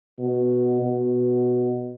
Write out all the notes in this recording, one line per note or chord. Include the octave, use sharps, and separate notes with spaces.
B2
B2